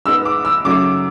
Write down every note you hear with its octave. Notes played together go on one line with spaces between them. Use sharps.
G#2 G#3 B3 E6
D6
E6
F#2 C#3 F#3 A3 D6